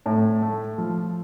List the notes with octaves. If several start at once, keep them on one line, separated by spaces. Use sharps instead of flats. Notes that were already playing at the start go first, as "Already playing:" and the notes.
A2
A3
F3